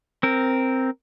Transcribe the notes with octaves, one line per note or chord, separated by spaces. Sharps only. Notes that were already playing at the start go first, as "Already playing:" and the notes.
C4 A#4